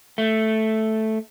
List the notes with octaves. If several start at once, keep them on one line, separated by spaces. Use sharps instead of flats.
A3